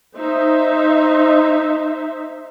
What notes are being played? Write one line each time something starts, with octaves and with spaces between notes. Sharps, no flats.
D#4 C5 E5